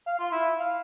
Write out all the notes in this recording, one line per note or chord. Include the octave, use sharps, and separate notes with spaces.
F5
F4
E4
F5